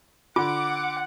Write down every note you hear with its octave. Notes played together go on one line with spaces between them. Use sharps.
D3 F4 F#5 D6